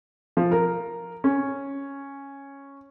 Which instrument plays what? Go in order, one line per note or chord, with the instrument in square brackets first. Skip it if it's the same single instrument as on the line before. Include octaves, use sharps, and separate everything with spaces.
[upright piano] F3
A#4
C#4